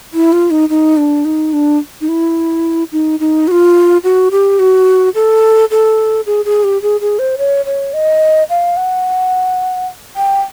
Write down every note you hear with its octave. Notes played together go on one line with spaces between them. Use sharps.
E4
F4
D#4
D#4
D4
D#4
D4
D#4
E4
D#4
D#4
F#4
F4
F#4
G4
F#4
A4
A4
G#4
G#4
G4
G#4
G#4
C5
C#5
C#5
D#5
F5
F#5
G5